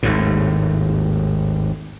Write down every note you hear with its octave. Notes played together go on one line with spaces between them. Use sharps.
G#1 D#2 A2